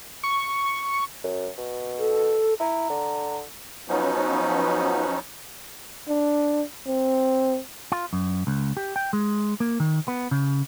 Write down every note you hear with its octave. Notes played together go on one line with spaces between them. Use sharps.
C#6
F#2
B2
A4
E4 A#5
D3
F3 F#3 B3 C#4 D#4
D4
C4
F4
F#2
C#2
G4
G5
G#3
A#3
D#3
B3
C#3